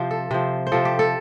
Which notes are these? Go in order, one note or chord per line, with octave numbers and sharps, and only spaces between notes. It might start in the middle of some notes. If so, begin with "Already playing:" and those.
Already playing: C3 F3 C5
A4
C3 F3 C5
C5
C3 F3 A4
G4
A4